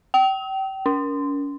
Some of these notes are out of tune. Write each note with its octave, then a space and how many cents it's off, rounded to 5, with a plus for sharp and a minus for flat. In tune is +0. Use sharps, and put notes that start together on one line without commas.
G5 -30
C#4 +40